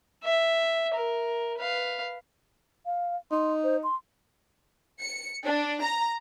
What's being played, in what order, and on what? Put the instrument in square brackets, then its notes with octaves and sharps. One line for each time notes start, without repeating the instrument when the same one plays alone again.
[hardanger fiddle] E5
A#4
B4 F5
[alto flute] F5
[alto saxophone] D#4 [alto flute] C6
[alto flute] C5
C6
[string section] C#7
D4
A#5